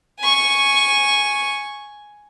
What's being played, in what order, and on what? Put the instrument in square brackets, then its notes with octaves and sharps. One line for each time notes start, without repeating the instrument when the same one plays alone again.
[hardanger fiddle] G#5 C#6